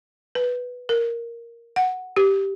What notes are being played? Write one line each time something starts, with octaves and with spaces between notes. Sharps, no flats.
B4
A#4
F#5
G4